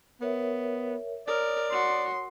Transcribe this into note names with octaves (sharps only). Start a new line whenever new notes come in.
B3 A#4 C#5 E5
A#4 C#5 D5 D#6
F#4 C6